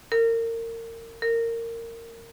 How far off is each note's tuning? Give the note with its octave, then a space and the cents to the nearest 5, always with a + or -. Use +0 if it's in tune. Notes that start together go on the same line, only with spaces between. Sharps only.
A#4 -30
A#4 -20